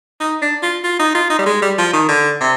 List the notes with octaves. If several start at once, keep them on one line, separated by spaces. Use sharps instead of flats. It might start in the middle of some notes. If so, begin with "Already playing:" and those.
D#4
D4
F4
F4
D#4
F4
D#4
G3
G#3
G3
F3
D#3
D3
C3